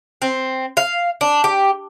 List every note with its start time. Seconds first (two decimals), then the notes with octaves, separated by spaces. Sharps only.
0.22 C4
0.77 F5
1.21 D4
1.44 G4